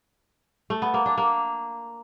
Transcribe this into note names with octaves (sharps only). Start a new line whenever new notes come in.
A3
B3
A#3
D4
A#3